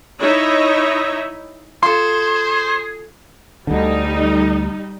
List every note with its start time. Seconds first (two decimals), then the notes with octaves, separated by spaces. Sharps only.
0.21 D#4 E4 C#5 D#5 E5
1.83 F4 G#4 A4 C5 C6
3.67 D2 D3 G3 D#4